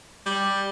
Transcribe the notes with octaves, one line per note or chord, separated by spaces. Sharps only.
G3